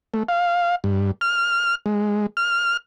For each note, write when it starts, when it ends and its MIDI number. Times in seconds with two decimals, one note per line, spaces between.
0.14 0.23 57
0.29 0.76 77
0.84 1.11 43
1.21 1.75 89
1.86 2.26 56
2.37 2.77 89